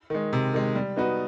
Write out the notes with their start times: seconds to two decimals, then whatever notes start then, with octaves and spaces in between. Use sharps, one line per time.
0.10 D#3 G#3
0.33 C3
0.54 D#3 G#3
0.75 G3
0.96 B3 D#4 F#4 B4